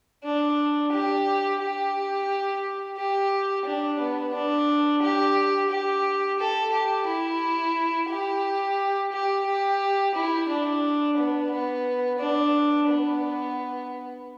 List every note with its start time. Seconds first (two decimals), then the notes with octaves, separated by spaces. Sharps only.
0.24 D4
0.92 G4
1.60 G4
2.97 G4
3.65 D4
3.99 B3
4.34 D4
5.02 G4
5.70 G4
6.39 A4
6.73 G4
7.07 E4
8.09 G4
9.12 G4
9.46 G4
10.15 E4
10.48 D4
11.17 B3
11.51 B3
12.19 D4
12.88 B3